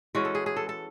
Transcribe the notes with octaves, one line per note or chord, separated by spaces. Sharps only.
E3 G#3 C#4 F#4
A4
G#4
G#4
A4
A4